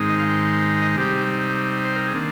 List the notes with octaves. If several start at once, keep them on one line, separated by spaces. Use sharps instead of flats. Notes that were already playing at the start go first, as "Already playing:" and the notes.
Already playing: G#2 D#3 G#3 C4 D#4
D#5
F5
G5
D#5
C3 G3 C4 D#4 G4
C5
A#4
G#4
D#3 A#3 D4